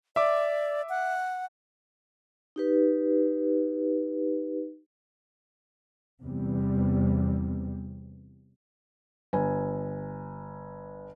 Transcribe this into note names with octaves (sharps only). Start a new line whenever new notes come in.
D5 E5 D6
F#5
D#4 G4 B4
E2 C3 G3
G1 G#5